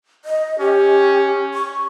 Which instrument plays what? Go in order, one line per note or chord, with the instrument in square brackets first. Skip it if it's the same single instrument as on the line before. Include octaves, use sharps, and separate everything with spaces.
[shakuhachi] D#5
[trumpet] C#4 [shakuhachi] G4
[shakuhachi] C#6